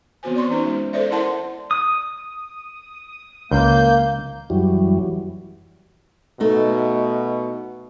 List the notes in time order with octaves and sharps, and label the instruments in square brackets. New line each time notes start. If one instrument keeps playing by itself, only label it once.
[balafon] E3 B3 C4 F#4 C5 G#5
D5 C6 C#6
C#4 D#4 B4 C5
G#3
G#4 A4 C5 D5 E5
E4 A#4 D5 F#5 A5 C6
[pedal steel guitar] D#6
[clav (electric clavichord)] C#2 [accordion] A#3 G6
[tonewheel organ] F#2 E3 F#3 G3
[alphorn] B2 [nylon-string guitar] A3 D#4 D#5